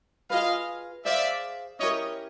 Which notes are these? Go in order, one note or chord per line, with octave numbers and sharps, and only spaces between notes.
F4 G#4 B4 D#5 F5
G#4 C5 D5 E5 F5
C#4 E4 G4 A#4 C#5 D#5